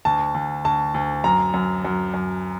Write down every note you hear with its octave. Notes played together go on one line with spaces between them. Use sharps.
D2 A5
D2
D2 A5
D2
F#2 A#5
F#2
F#2
F#2